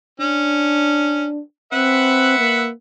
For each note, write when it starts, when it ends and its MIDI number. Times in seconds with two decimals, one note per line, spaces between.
0.20 1.26 61
0.20 1.40 62
1.73 2.38 60
1.73 2.66 71
1.73 2.66 76
1.73 2.66 78
2.38 2.71 58